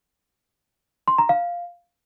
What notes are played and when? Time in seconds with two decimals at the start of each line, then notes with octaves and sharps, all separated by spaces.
1.08 C6
1.18 A#5
1.29 F5